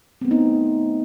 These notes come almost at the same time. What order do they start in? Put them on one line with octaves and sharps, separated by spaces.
C4 B3 A3 D#4